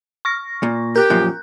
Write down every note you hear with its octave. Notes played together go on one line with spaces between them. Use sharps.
C#6 F6 A#6
A#2
G4 A#4 F#6 G6
F#2 A#2 F3 F#6